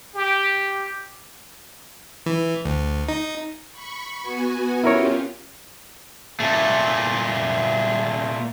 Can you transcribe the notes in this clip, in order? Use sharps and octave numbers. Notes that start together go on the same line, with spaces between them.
G4
E3
D2
D#4
B5 C#6
B3 F#4 G#5
C#4 E4 F4 G4 A#4 C#5
A#2 A3